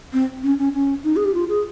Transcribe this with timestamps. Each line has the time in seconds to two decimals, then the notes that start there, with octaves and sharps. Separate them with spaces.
0.13 C4
0.43 C#4
0.59 C#4
0.74 C#4
1.04 D#4
1.16 G#4
1.25 G4
1.34 F4
1.49 G#4